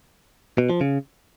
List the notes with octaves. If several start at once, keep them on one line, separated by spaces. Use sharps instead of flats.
B2
F3
C#3